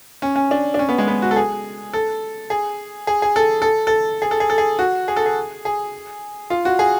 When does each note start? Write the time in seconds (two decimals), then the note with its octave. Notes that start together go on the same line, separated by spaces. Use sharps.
0.22 C#4
0.36 C#4
0.51 D4
0.74 D4
0.79 C#4
0.89 B3
0.98 G#3
1.08 B3
1.22 F#4
1.31 A4
1.36 G#4
1.93 A4
2.50 G#4
3.07 G#4
3.22 G#4
3.36 A4
3.62 A4
3.87 A4
4.22 G#4
4.31 A4
4.40 G#4
4.50 A4
4.58 G#4
4.79 F#4
5.08 G#4
5.16 A4
5.26 G#4
5.65 G#4
6.50 F4
6.65 F#4
6.79 G#4